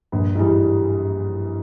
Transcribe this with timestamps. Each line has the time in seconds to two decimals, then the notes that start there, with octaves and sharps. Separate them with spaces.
0.12 A#1 G2
0.35 G#2 E3 G3